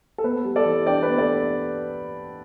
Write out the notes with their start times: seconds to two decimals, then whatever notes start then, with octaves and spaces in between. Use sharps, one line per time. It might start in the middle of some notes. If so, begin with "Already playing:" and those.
0.18 A4
0.24 B3 B4
0.45 G3
0.56 A4 D5
0.65 E3
0.86 D4 D5 G5
1.03 B4
1.08 B3
1.18 A4 D5